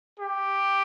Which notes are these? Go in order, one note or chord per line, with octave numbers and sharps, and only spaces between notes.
G4